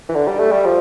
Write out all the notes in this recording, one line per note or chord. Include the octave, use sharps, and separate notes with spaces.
E3
D3
G3
A3
G3
F3